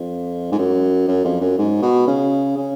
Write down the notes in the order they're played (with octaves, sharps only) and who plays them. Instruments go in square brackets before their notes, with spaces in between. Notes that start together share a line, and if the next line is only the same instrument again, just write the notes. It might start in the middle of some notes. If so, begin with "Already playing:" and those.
Already playing: [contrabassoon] F2
G#2
F#2
F#2
F2
F#2
G#2
B2
C#3
C#3